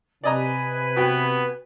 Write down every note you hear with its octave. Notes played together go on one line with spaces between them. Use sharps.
C3 B4 D5 D#5 G#5 A#5
B3 F#4 G5